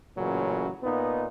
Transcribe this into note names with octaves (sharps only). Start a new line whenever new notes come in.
A1 A#2 C#3 F#3
A#2 B3 D#4